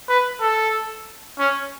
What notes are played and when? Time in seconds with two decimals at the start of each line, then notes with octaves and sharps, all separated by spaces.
0.09 B4
0.41 A4
1.39 C#4